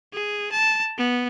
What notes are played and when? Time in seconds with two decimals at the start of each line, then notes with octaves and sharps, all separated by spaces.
0.13 G#4
0.52 A5
0.98 B3